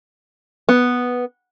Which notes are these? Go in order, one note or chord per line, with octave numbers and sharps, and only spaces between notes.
B3